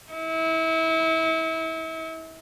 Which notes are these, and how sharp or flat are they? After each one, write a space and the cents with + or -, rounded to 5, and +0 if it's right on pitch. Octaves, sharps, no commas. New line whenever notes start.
E4 -30